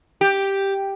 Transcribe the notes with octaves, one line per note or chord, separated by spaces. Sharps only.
G4